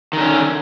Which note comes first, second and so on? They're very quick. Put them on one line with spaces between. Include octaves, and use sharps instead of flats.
D#3 D3 C#4